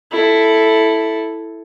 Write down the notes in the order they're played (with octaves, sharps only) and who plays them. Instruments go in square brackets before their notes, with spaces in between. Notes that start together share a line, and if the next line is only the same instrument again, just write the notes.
[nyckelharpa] E4 A4